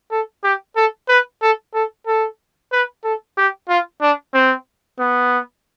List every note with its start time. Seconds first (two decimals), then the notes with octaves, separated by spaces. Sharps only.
0.11 A4
0.43 G4
0.76 A4
1.09 B4
1.42 A4
1.74 A4
2.07 A4
2.72 B4
3.04 A4
3.37 G4
3.69 F4
4.02 D4
4.34 C4
4.99 B3